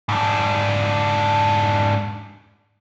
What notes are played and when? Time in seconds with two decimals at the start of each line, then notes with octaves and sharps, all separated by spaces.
0.09 G#2 D4